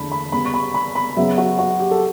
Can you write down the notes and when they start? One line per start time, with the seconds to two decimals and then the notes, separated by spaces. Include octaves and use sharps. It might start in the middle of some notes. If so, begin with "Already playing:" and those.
Already playing: E2 D3 A3 A5 B5
0.12 B5
0.32 C#3 G3 B3 B5
0.45 C#6
0.54 B5
0.74 B5
0.95 B5
1.16 C#3 F#3 B3 E5
1.38 F#4
1.59 F#4
1.80 G4
1.91 A4